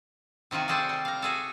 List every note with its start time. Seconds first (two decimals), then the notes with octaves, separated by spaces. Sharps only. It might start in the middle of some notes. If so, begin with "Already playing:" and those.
0.51 C3 D#3 F4 F#4 G#5
0.68 G3 F#4 G#4 A4 C5 D5
0.89 G3
1.05 F5 A#5
1.22 F#4 G#4 A4